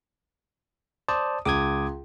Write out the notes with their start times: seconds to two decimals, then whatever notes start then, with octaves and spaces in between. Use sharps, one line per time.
1.09 C5 D5 A5 D#6
1.45 C#2 D6 D#6 G#6